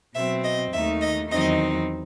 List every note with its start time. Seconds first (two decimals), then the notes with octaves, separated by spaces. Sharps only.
0.15 B2 F#3 C4 E5
0.44 D#5
0.73 D#2 D#3 A3 D#4 E5
1.01 D#5
1.30 E2 D#3 F#3 C4 D#4 D#5